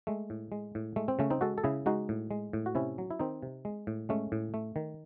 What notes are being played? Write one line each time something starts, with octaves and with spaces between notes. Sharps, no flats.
G#3 A3
A2
G#3
A2
G#3 A3
C4
C#3 A3 C#4
C4 D#4
G#3 F#4 A4
A4
C#3 E4 G#4
G#3 D#4 F#4
A2
G#3
A2
F#4
C3 C#4 E4
F#3
E4
D#3 C4 D#4
C3
G#3
A2
G#3 A3 C#4
A2
A3
D#3